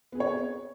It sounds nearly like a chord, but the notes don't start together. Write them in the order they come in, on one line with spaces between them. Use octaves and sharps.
B3 G#4 C4 C#5